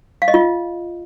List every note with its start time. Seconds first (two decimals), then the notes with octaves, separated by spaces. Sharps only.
0.22 F5
0.28 D#5
0.34 F4